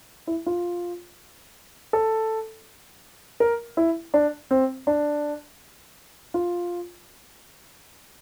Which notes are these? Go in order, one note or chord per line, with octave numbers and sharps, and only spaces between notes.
E4
F4
A4
A#4
E4
D4
C4
D4
F4